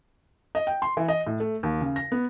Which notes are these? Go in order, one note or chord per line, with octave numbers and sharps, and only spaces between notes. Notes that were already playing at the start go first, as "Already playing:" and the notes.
D#5
G5
C6
E3
D#5
A2
A3
D#2
C#3
A#6
B3